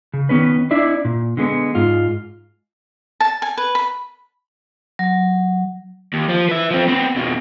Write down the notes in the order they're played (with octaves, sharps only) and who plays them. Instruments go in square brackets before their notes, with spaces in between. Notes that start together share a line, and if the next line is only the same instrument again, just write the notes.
[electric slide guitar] C#3
D#3 B3 C#4 B4
D4 E4 D5 E5
A#2
D3 G#3 A#3 B3
G#2 F4
[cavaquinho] A5
G#5
B4
B5
[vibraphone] F#3
[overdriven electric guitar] D#2
F3
B4 E5
F3 C4
B3 C4
F2 B2